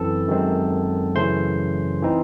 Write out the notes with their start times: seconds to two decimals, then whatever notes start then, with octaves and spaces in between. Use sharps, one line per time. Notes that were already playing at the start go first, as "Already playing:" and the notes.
Already playing: F#2 E3 C4 A4 A5
0.29 F#2 D#3 G#3 C4
1.15 F#2 C#3 E3 A3 C#4 C5 C6
2.02 E3 C4 D#4